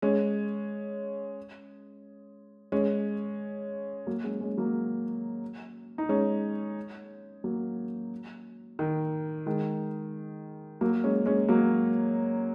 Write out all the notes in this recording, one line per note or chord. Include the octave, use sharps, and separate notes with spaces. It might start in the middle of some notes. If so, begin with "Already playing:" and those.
G#3 C#4
G#3 C#4
F#3 A#3
G#3 C#4
G#3 C#4
F#3 A#3
D#4
G#3 C#4
F#3 A#3
D#3
D#3 G#3
F#3 A#3
G#3 C#4
G#3 C#4
F#3 A#3